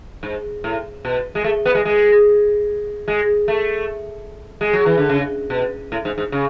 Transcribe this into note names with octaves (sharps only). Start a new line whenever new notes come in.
G#2
A2
B2
G#3
A3
B3
G#3
G#3
G#3
A3
G#3
F#3
E3
D3
C#3
B2
A2
G#2
G#2
C#3